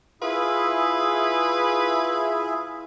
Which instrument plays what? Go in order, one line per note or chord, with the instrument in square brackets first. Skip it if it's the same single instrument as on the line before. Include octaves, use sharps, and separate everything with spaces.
[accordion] E4 G#4 E5 [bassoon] F4 [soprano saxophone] B4